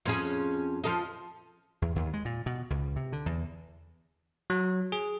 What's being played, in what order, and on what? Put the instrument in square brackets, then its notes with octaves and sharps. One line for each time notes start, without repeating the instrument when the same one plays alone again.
[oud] F2 C#4 G#4
F3 A4 D#5
[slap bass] E2
D#2
G#3
A#2
B2
C#2
C3
D3
E2
[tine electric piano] F#3
G#4